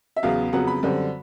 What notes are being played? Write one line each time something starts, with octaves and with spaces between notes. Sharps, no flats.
E5
E2 C#3 F#3 B3 F5
F2 C#3 F#3 B3 F#5
B5
F#2 D3 G3 C4